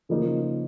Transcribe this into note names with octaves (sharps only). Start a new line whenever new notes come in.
C#3 F3 A#3 D#4 A#4